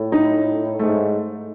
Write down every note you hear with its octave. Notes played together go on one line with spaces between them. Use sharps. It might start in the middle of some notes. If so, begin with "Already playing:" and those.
Already playing: A2
D#4
G#2 A3